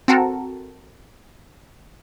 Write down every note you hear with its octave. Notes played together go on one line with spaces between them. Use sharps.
C4 F#4 A4 A#4